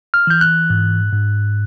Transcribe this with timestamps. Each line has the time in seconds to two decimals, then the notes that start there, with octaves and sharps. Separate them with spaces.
0.14 F6
0.27 E3 G6
0.41 F#6
0.70 G#2
1.12 G#2